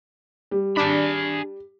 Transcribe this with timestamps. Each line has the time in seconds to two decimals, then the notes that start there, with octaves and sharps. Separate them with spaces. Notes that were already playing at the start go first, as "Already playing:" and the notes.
0.51 G3
0.77 D4 G#4 B5